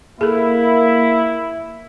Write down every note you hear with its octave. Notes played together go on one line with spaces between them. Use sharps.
A#3 E4 G#4 A4